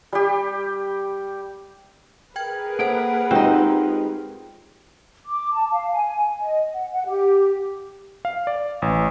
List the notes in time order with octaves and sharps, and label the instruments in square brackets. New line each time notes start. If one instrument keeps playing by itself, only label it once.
[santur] G3 G4
[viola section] G#4 A#4 B4 [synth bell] G5 G#6
[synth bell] A#3 A4 C5 [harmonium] F#5 [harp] D7
[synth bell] G#3 F4 G4 [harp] C4 D#4
[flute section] D6
A5
F5
G#5
D#5
F#5
F#5
G4
[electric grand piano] F5
D5
A1